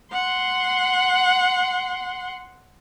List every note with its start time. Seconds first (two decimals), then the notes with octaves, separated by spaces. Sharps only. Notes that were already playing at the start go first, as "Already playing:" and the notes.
0.12 F#5 C6